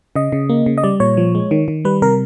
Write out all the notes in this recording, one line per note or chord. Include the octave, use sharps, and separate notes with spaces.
C#3 D#5
C#3
A#3
C#3
D#5
G3 D5
A#2 C#5
F3
G#3
D#3
D#3
G3 B4
C3 A#4